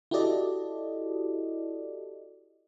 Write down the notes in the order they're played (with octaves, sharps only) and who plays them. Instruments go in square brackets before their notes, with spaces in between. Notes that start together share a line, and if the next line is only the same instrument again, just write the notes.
[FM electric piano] E4 F#4 G4 A4 D5 D#5